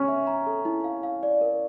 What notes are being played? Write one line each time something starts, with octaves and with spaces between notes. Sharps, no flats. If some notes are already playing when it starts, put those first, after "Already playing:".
Already playing: C#4 C#6
E5
A#5
A4
E4
F5
F5
D5
A#4